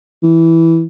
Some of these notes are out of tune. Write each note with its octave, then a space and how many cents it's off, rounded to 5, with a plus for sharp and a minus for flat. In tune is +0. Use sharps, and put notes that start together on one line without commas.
E3 -5